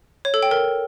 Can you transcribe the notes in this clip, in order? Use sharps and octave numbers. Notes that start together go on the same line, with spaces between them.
C#5
A4
G5
A#4